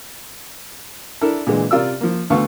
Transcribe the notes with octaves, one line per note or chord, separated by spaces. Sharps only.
D4 E4 A4 A#4
A#2 D3 E3 G#3
C3 F4 A#4 D5 E6
F3 A#3
D2 A3 B3 A4 F5 C#6